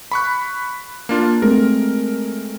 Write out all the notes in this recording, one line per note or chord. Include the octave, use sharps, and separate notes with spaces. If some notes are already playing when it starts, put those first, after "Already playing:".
B5 C#6 F#6
A#3 D4 F4
G#3 A3 C4 A#4